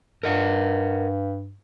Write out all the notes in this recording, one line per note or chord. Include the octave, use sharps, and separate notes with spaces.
G2 A#4 D#5 F#5